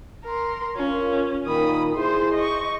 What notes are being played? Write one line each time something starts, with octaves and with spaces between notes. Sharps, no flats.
A#4 C6
C#4 F4 A#4
A#2 D#3 B5 D#6
E4 G#4 C5 C6
D#5 C#6